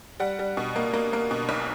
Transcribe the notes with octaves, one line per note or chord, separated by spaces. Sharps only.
G3 F#5
G3
B2
A#3
A#3
A#3
B2
B1